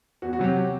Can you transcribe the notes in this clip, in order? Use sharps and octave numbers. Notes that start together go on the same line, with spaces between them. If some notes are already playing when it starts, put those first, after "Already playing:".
E2 F#4
F#4
C3 F#3 G4